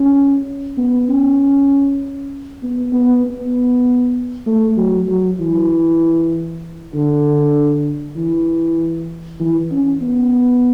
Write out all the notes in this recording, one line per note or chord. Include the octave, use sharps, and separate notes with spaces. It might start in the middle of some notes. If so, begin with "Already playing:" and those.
Already playing: C#4
B3
C#4
B3
B3
B3
A3
F#3
F#3
E3
D3
E3
E3
C#4
B3